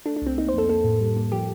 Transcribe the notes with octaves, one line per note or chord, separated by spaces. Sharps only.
A3 D4
D4
C2 C4
A#3 D#4
C5
F2 A4
A#3 A4
A2
G3
A#3
F3 G4